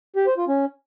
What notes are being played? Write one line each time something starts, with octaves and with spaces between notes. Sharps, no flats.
G4
C5
F4
C#4